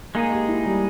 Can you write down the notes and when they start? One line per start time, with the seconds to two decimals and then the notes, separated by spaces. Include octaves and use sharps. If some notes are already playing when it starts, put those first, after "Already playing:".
0.15 G#3 A#3 D#4 G#4
0.32 G4
0.48 E4
0.65 G3